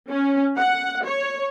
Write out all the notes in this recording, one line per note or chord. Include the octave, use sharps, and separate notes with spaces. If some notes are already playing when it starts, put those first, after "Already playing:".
C#4
F#5
C#5